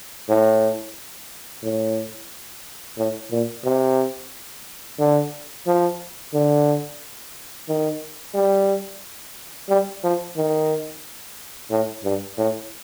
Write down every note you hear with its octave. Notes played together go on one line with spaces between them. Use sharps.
A2
A2
A2
A#2
C3
D3
F3
D3
D#3
G3
G3
F3
D#3
A2
G2
A2